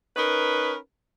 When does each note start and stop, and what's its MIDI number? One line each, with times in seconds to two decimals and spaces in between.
0.17 0.77 61
0.17 0.77 63
0.17 0.77 70
0.17 0.77 71